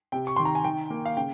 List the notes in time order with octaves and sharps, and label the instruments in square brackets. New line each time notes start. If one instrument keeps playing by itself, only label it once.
[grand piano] C3 G5
C#6
D#3 C6
A#5
G#5
D#3 G5
A#3
F5
C#3 G5